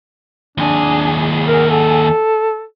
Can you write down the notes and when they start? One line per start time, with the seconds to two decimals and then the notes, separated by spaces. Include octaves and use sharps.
0.58 D#2 D4 G#4
1.48 A#4
1.71 A4